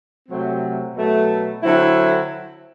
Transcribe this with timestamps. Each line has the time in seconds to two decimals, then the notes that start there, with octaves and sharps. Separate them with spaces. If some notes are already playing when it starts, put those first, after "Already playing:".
0.29 C3 F#3 A3 C4
0.95 B2 F#3 A3
1.62 D3 F#3 C4 E4